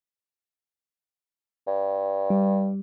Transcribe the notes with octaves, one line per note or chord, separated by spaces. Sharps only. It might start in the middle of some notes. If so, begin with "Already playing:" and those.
G2
G3